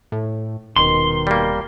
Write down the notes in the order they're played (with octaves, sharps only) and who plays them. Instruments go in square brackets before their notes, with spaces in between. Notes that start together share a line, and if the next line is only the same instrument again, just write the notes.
[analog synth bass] A2
[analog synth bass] D#1 [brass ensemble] B2 D#3 [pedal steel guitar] C6
[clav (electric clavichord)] G3 A#3